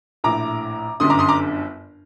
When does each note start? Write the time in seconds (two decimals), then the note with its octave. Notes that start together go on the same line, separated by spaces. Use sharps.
0.24 A#1 A2 A#5 D6
1.00 G1 F#2 D3 C6 D#6
1.10 A#5 D6
1.19 C6 D#6
1.28 A#5 D6